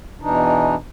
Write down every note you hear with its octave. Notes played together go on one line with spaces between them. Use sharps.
E2 B2 E3 D4 D#4